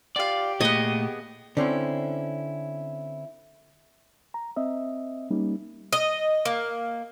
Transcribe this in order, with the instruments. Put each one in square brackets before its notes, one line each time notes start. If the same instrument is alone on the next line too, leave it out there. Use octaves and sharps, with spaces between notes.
[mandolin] F4 F5 [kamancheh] G4 [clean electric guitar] D5
[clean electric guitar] A#2 A3 [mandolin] B3 G#4 [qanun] D#5
[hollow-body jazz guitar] D3 C4 C#4 E4
[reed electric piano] A#5
C4 D#5 E5
G3 A#3 C#4 D#4
[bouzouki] D#5
A#3